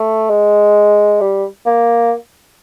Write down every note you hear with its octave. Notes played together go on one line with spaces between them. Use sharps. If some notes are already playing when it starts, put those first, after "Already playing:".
Already playing: A3
G#3
G3
A#3